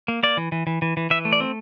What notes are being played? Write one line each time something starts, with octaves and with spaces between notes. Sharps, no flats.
A#3
A#3 D5
E3
E3
E3
E3
E3
E3 E5
A3
D5
C4